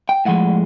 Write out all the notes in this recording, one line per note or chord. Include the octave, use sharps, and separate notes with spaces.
G5
A2 F3 G#3 F#5